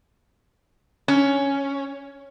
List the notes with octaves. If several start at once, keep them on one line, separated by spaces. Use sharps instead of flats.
C#4